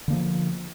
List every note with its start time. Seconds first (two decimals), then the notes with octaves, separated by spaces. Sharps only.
0.08 D3
0.10 A#3
0.13 F3